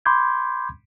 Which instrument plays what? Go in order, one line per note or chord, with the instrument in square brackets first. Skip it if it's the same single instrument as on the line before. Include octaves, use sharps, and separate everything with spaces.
[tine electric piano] B5 C6 D6 G6 G#6